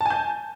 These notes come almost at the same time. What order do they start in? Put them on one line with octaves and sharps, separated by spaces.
A5 G#5 G6